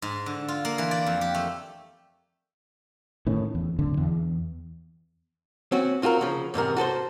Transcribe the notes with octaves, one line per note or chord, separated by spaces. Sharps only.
G#2
D3
F4
A#3
E3
D5
F2
G4
A3
A2 D#3 C#4
E2
D1 D3
E2
C4 C#4 F#4
C4 F4 F#4 G#4 A#4
C#3 F3
E2 G#2 C3 A#4
F#4 A4 B4 C5